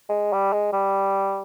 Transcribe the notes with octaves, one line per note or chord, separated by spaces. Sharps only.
G#3
G3
G#3
G3